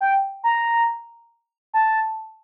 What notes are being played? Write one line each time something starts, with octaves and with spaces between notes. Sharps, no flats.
G5
A#5
A5